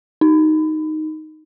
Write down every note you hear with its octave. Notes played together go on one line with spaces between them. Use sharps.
D#4